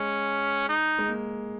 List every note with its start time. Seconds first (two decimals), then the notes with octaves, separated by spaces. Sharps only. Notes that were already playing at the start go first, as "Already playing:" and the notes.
Already playing: G#3 C#4
0.69 D#4
0.99 G#3
1.09 A#3